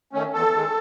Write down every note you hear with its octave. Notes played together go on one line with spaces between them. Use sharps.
D#3 A3 C#4
E2 A4
D#3 G#3